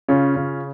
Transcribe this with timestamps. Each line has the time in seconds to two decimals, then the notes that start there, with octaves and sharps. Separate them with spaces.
0.08 C#3 C#4 F4
0.36 C#3